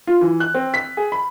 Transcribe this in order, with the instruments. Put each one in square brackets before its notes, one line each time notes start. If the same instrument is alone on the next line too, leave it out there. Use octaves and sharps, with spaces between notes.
[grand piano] F4
E3
F#6
C4
B6
G#4
B5